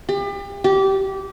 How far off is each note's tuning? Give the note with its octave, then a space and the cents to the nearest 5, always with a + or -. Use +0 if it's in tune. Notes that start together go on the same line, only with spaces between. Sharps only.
G4 +35
G4 -20